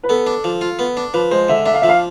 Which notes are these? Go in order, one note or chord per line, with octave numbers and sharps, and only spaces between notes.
B4
B3 A4
D4
F3
F4
B3
D4
F3 B4
G#3 C5
D3 E5
D4 E5
F5
F3 E5
F5